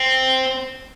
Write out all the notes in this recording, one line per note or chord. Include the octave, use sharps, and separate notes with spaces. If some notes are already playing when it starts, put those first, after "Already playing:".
Already playing: C4